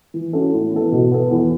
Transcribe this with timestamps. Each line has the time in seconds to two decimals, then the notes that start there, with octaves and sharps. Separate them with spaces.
0.14 E3
0.33 C#4 F#4 A4
0.53 A2
0.72 E3 B3 A4
0.92 B2
1.12 B3 A4
1.31 E2